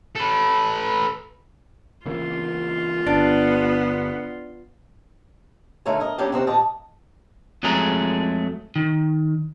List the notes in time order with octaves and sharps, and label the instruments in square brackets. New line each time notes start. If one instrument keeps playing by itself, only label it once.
[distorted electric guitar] A4 B4
[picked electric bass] C#3 E3 A#3 [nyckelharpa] F4 C6
[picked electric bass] G1 [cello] B3 [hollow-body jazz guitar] D4
[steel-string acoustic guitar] D3 A3 D#4 A#4 C#5 G#5
A#4 D#5
F#3 G3 A#3 C#4 D4 G4
C3 D#3 C4 F#4
A#2 G4 D#5 G5 A5
[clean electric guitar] F2 F#3 G#3 A3 G#4 A#5
D#3